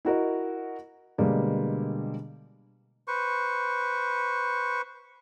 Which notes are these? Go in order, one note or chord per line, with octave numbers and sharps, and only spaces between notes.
E4 F#4 A#4 D#5
B2 D3 G3 G#3 A#3
B4 C5 C#6